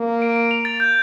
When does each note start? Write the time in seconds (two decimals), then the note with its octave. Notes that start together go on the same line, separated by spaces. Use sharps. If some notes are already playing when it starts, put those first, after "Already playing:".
Already playing: A#3
0.22 D7
0.36 D7
0.51 F7
0.65 A6
0.80 G6